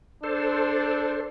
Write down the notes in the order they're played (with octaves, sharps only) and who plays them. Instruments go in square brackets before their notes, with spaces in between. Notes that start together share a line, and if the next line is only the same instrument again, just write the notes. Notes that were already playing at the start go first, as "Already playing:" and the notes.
[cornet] D4 [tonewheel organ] A4 C5